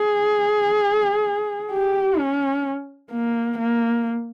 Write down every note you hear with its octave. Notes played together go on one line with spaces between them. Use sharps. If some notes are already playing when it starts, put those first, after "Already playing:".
Already playing: G#4
G4
C#4
A#3
A#3